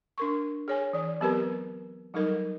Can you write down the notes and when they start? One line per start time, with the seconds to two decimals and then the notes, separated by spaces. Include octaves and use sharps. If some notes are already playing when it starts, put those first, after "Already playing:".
0.18 D4 A#4 C#6
0.68 G#4 C#5 G#5
0.93 E3 D5
1.21 F#3 B3 C4 G4 A#4 B4
2.14 F#3 G3 D#4 A4 A#4 D#5